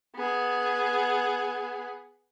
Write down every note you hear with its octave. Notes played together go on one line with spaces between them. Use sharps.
B3 G#4